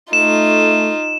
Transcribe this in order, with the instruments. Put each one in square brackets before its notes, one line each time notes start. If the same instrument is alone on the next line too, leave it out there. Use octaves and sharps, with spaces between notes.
[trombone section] A3 [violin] D#4 F4 [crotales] E7